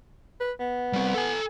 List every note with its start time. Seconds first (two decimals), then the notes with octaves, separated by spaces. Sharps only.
0.40 B4
0.60 B3
0.93 G3 C4
1.14 A4 G#5